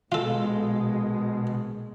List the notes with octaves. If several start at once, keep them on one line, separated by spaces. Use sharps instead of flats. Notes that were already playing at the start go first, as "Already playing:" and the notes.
A#1 B2 G#3 F4 A4